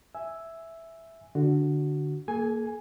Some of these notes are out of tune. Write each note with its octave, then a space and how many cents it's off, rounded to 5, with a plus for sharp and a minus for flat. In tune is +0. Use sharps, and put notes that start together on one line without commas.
E5 +0 G#5 +0 E6 +0
D3 +0 F#4 +0
A#3 +0 G#4 +45 G#5 +0